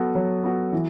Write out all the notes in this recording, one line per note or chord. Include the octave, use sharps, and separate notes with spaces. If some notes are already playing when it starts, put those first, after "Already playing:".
Already playing: F#3 B3 F#4 A4
F#3
B3 F#4 A4
E3